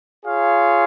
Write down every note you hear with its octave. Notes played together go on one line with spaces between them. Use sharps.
F4 G#4 C#5 F5